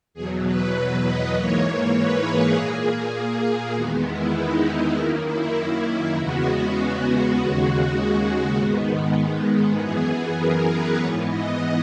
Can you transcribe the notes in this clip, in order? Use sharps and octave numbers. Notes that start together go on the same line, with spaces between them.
E2 B2 F#3 G#4
B4
B4
D#5
G#2 E3 A#3 C#5
B4
G#4
A#2 A#3 G#4
E2 D#3 G#3 B3 F#4
E4
D#4
D#4
F#2 D#3 A#3 E4
E4
E2 C#3 G#3 B3 F#4
D#2 C#3 G#3 F#4
G#2 D#3 G#3 B3
F#2 E3 B3 G#4
A#4
B4
G#2 E3 B3 C#5
D#5